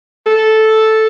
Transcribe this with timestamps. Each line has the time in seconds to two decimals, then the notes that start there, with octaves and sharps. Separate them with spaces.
0.26 A4